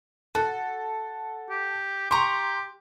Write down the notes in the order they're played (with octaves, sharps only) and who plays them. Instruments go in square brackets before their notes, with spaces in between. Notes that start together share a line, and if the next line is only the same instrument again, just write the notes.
[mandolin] F#4 [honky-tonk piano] A4
[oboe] G4
[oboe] G4 [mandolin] A#5 C#6 [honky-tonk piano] C6